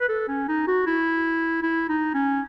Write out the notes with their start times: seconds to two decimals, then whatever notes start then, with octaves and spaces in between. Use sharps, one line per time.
0.01 B4
0.09 A4
0.28 C#4
0.48 D#4
0.67 F#4
0.87 E4
1.63 E4
1.89 D#4
2.14 C#4